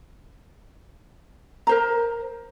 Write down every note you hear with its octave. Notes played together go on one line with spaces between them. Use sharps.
A#4 C5 A#5